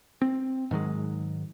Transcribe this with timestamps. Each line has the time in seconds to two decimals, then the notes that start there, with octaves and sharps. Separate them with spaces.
0.22 C4
0.71 G#2 D#3 F#3 G#3